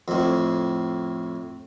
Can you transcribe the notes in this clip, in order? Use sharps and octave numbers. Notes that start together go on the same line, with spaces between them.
F2 A2